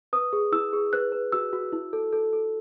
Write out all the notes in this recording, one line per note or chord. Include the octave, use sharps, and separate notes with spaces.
B4 D#6
G#4
E4 E6
G#4
B4 F#6
B4
F#4 E6
F#4
E4
A4
A4
A4